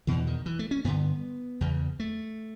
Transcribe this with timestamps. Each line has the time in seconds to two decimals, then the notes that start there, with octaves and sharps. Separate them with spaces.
0.07 E2 B2 E3
0.27 D#3
0.46 E3
0.59 A3
0.71 C#4
0.84 G2 D3 B3
1.61 E2 C#3
2.00 A3